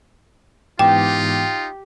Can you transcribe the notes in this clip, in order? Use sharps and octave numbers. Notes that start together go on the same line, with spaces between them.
G#2 E3 B3 D#4 F4 G4 G5